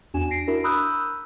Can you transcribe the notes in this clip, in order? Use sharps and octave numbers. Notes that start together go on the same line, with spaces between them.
E2 D4 F#4 G#5 E7
A#6 C7 D7
D4 E4 F#4 A#4
A#5 B5 D#6 E6 F#6 G6